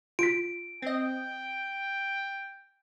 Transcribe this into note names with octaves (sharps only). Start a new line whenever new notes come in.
F4 B6 D7
C4 D#5 G5